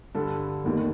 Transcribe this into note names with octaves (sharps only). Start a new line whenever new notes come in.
G2 D3 G3 A4
F1 D#2 D#3